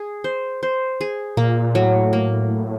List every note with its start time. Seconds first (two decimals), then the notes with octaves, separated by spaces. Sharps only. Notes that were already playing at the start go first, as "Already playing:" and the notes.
Already playing: G#4
0.24 C5
0.63 C5
1.01 G#4
1.37 A#2 A#3
1.75 A2 F#3
2.13 A#3